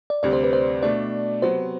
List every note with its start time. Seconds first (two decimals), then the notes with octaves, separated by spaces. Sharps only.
0.10 D5
0.23 D2 C3 G3 C4 D5
0.33 C5
0.44 B4
0.53 C5
0.83 B2 A3 D4 D5
1.41 C3 F#3 B3 C5